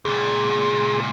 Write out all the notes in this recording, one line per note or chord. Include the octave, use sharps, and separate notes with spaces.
C#2 A#2 G#4